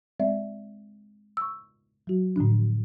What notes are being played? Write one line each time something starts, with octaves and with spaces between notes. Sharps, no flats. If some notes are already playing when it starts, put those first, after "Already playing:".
G#3 C4 D5 E5
C#6 E6
F#3 F#4
A2 D3 F3 D4